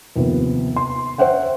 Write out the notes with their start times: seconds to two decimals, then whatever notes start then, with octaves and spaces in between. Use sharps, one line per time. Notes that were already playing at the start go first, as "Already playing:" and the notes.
0.16 D#2 C3 F3 B3
0.76 C6
1.18 C5 C#5 E5 F#5 G5